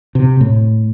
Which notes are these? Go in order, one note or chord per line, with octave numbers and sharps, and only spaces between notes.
C3
A2